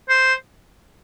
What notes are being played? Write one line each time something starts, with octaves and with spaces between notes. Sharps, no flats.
C5